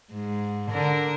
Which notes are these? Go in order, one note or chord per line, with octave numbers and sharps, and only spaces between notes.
G#2
D3 A#4